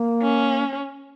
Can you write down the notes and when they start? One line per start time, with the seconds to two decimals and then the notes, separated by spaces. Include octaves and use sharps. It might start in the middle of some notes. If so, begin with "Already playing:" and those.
Already playing: A#3
0.22 C#4